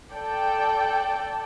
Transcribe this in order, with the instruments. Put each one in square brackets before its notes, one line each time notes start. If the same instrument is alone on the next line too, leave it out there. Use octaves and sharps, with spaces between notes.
[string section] A4 D5 G5 A5